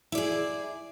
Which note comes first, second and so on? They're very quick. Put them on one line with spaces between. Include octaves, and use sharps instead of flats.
E4 D5 G#4